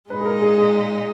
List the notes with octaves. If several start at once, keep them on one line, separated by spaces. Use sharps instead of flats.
A#2 G#3 D#4 B4
G#4
A#4
G#4
G#4